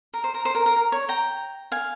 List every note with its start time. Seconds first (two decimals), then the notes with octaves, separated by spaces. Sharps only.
0.14 A#4
0.24 C5
0.34 A#4
0.45 C5
0.55 A#4
0.66 A#4
0.76 A#4
0.92 C#5
1.09 G5 A#5
1.72 F5 G#5